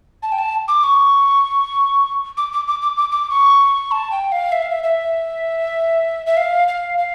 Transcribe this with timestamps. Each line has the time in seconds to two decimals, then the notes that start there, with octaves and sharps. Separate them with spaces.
0.23 A5
0.32 G5
0.38 A5
0.68 D6
0.83 C#6
2.37 D6
2.53 D6
2.68 D6
2.82 D6
2.97 D6
3.12 D6
3.30 C#6
3.91 A5
4.11 G5
4.32 F5
4.52 E5
4.62 F5
4.72 E5
4.83 E5
6.26 E5
6.37 F5
6.68 F5
6.98 F5